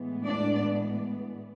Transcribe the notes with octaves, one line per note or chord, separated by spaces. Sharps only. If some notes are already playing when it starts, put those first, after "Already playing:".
Already playing: A2 E3 G#3 B3
D4 D5